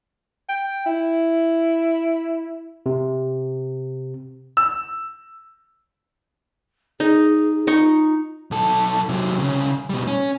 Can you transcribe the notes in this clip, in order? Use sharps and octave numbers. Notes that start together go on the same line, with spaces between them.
G5
E4
C3
E6
D#4 G#4
D#4 F4 C#6
B1 A4
C3 F#3
C2 C#3
B2 G3
C#4